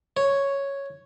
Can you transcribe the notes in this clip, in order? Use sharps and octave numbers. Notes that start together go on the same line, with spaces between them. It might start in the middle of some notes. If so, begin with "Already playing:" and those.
C#5